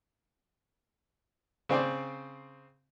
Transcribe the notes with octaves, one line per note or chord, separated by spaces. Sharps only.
C#3 C4 C5 D5